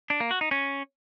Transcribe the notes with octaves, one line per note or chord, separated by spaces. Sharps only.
D4
A#3
F#4
D#4
C#4